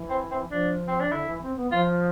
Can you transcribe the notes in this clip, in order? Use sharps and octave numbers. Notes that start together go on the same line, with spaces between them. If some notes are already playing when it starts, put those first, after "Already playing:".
Already playing: E3
C4
C4
F3 D4
C4
D4
D3 E4
E3
C4
B3
F3 F4